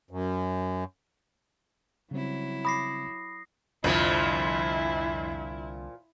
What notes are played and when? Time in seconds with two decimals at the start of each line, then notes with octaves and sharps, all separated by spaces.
0.11 F#2
2.11 C#3 F#3 G3 C4 E4
2.65 B5 D6 D#6 A#6 C7
3.84 C2 F2 A#2 D3 F3 E4